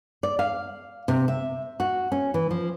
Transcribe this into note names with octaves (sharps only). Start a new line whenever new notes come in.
D5
F5
C3
E5
F#4
C#4
E3
F3